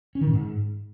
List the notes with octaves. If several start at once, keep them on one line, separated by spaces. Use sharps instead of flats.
C#4
D#3
A#2
G#2